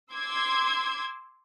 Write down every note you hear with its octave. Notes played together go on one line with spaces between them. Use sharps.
C6 D6 E6 G#6